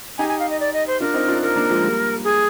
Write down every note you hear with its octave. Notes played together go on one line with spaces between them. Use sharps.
D#4 G4 G#5
G#5
F5
D#5
D5
D#5
C5
D4 F4 A#4
C4 D#4
D4 F4
A#4
A#3 D4
F3 G#3
G3 A#3
G#4